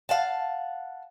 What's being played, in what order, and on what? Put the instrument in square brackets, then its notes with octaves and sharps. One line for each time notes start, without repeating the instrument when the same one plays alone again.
[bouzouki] F5 F#5 A5